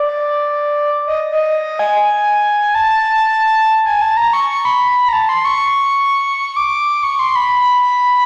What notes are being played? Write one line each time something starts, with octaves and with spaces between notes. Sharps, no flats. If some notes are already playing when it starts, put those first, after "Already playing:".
Already playing: D5
D#5
D#5
G#5
A5
G#5
A5
A#5
C#6
C#6
B5
A#5
A5
C6
C#6
D6
C#6
C6
B5